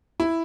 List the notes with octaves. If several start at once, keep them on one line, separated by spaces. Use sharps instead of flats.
E4